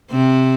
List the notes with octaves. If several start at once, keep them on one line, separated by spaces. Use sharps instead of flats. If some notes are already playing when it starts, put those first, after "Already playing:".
C3 C4